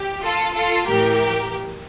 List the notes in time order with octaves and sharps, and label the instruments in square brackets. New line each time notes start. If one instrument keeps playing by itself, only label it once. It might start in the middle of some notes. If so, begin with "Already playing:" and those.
Already playing: [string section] G4
F4 A4
F4 A4
A2 E3 G4 A#4